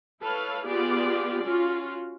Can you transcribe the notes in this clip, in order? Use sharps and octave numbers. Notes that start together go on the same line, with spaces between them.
E4 A4 B4 C#5 F5
B3 F4 G4 G#4 D5
C#4 F4 F#4